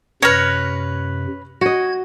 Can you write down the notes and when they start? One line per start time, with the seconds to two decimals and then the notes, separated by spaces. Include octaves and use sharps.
0.22 F#2 C3 B4 C#5 F6 A#6 C#7
1.61 F#4 D#5 G#6